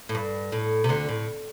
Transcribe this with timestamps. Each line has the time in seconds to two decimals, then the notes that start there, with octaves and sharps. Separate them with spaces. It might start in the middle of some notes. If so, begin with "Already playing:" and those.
0.09 A2
0.15 G2
0.52 A2
0.84 C3
0.89 D2 D3
1.09 A2